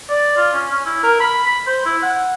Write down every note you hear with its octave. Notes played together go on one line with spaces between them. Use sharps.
D5
F4
C#4
C#4
E4
A#4
B5
B5
C5
E4
F#5